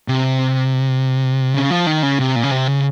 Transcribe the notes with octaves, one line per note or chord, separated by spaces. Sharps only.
C3
C#3
F3
D#3
C#3
C3
A#2
C#3
C3
C#3